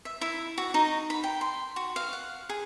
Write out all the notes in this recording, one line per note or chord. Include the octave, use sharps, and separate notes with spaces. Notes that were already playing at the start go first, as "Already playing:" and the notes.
E5
E4
F#4
D#4
B5
G5
C6
F#4
F5
F#5
G#4